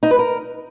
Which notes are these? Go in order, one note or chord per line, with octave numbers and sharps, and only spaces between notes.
D#4
B4
A#4